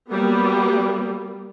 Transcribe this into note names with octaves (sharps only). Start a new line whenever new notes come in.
F#3 G3 A#3 B3